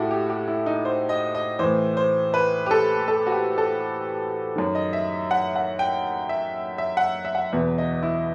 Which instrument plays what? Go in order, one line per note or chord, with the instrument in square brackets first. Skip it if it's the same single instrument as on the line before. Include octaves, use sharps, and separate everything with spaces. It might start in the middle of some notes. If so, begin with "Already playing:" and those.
Already playing: [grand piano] A2 E4 F#4 G4 A4
G4
G4
E4
D#4
C5
D#5
D#5
A2 E3 C5
C5
B4
G4
A4
A4
F#4
G4
A4
F#2 D#3
D#5
E5
F#5
F#5
G5
E5
E5
F#5
E5
F#5
E2 B2 E5
D#5
E4